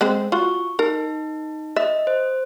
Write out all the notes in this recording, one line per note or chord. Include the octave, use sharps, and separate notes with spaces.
G#3 C4 C5
F4 F#4 C#6
D#4 A#4
D#5 E5
C5